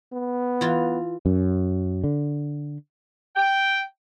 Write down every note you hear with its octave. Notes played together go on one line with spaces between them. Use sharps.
B3
E3 F4
F#2
D3
G5